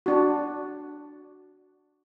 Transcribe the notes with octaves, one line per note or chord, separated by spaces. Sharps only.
D4 F#4